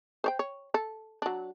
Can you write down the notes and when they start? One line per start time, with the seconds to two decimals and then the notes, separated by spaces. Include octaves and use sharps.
0.24 C5 C#5 G5
0.39 C#5
0.74 A4
1.22 F#3 D4